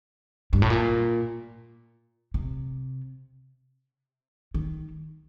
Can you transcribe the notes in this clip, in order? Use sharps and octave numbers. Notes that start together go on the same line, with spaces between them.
G2
A2
A#2
C3
D#3